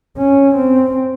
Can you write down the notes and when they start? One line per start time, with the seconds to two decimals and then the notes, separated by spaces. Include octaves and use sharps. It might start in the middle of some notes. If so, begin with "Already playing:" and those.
0.18 C#4
0.55 C4